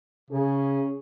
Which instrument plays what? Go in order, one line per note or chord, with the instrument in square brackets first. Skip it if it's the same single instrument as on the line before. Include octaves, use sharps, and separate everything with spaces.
[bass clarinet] C#3 [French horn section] C#4 G#4